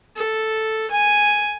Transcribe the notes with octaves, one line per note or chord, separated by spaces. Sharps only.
A4
G#5